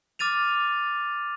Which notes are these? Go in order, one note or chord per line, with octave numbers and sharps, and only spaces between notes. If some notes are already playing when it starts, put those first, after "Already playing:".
D6 F6 A6 D#7 F7